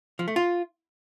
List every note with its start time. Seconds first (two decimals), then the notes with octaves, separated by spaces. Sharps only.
0.19 F3
0.28 A3
0.36 F4